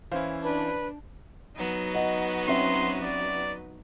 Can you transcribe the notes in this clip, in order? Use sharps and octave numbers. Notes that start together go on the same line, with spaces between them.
E3 C#4 E4 C5 F5
D4 B4
F#3 B3 D#4 F#4 B4
D#5 F#5
C4 C#4 E5 C6
D5